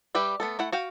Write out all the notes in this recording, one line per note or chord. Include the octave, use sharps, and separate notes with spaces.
G3 G4 B4 E5
A3 B3 A4
A3 E4 F#5
F#4 F5 G5